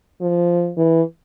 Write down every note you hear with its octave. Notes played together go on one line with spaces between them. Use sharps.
F3
E3